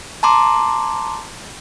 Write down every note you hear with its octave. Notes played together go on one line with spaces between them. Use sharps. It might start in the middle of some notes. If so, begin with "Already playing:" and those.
A5 A#5 C6 D6